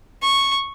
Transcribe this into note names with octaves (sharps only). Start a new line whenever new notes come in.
C#6